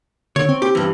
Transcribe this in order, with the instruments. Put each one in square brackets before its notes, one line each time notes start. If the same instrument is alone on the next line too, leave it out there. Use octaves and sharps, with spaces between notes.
[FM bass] D3 [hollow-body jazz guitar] C#5
[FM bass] C4
[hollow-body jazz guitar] G4
G2 E3